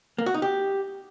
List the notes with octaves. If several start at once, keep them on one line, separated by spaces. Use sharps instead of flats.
A#3
F#4
D#4
G4